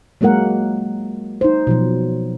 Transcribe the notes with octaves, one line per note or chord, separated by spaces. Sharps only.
F#3 G#3 A#3 A#4 F#5
D#4 C5
B2 F3 F#3